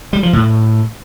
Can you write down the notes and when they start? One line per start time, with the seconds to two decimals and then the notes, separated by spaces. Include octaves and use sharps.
0.13 G3
0.23 F3
0.33 A2